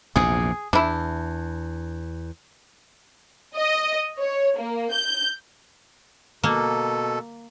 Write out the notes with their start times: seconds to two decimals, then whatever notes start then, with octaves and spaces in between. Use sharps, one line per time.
0.16 A#1 E2 C3 G#4
0.73 E2 D4 E4
3.55 D#5
4.19 C#5
4.58 A#3
4.93 G6
6.44 B2 A#3 A4